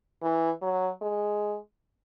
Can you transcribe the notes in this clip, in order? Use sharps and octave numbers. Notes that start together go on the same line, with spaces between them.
E3
F#3
G#3